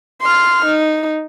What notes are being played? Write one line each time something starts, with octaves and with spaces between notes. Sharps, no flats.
C6 F6
D#4